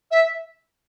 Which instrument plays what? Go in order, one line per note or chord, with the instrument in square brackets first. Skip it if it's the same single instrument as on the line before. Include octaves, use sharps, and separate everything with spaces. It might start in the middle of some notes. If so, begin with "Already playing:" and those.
[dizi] E5